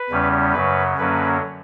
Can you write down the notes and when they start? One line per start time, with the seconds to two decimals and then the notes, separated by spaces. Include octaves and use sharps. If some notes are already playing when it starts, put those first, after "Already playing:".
Already playing: B4
0.10 E2 C#3 G3 C#4
0.53 F#2 C#3 F#3 B4
0.98 F#2 D3 F#3 A#3 C#4 B4